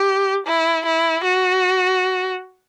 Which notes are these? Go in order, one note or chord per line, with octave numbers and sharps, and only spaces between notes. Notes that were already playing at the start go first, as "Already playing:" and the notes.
Already playing: G4
E4
E4
F#4